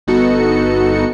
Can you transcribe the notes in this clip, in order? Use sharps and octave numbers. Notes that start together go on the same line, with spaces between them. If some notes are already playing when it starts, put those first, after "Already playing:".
G1 B3 D#4 F#4 A4 C#7